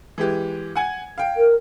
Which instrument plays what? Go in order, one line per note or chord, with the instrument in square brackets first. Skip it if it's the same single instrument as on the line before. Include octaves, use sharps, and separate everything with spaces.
[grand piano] E3 G#3 G4
F#5 G#5 G#6
F5 G5
[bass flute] A#4